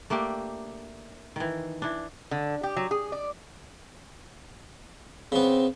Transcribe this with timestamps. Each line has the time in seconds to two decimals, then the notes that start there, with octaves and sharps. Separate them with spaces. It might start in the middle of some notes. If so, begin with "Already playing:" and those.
0.10 A3 A#3 D4 G4
1.36 D#3 E3
1.82 E3 D4
2.31 D3
2.63 G4
2.77 F#3
2.91 G#4
3.12 D5
5.32 C#3 B3 C4